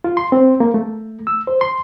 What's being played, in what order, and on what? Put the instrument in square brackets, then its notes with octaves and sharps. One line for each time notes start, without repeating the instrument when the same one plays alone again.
[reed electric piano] F4
C6
C4
A#3
A3
E6
C5
C6